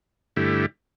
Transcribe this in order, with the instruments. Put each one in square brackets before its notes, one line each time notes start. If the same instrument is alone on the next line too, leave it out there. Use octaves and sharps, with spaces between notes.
[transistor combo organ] G2 D3 A3 E4 G4